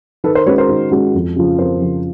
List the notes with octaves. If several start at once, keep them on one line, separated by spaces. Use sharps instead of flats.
D#3 A4 B4
A#4 C5
G#3 C#4 F#4 B4 C#5
A#4 C5
D#3
G#3 C#4 F#4
F2
C#3 F3
F2 A#4 C5
C#3 F3